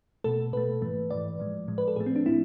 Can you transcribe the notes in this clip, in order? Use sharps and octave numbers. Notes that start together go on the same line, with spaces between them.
B2 A3 A4
B2 A3 B4
G#2 E3 A3
G#2 E3 A3 D5
A2 F3 G#3
A2 F3 G#3
B4
A4
A2 F3 A3 G#4
C4
D4
A2 F3 A3 E4